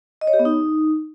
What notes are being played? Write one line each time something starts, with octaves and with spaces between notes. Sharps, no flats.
D#5
C#5
G4
B3
D#4